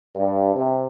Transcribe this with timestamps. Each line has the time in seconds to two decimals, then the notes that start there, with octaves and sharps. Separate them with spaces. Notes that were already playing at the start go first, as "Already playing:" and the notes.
0.16 G2
0.54 C3